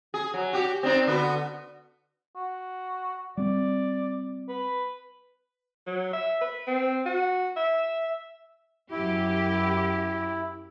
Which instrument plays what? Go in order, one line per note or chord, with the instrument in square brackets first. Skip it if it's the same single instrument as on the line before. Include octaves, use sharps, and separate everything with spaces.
[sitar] G#4
F#3
F#4 G4
C4 D4 D#4
D3 B3 F#4
[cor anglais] F#4
[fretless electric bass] G3 C4 [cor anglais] D5
[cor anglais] B4
[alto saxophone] F#3
E5
B4
C4
F#4
E5
[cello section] F#2 G4 [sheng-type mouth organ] E4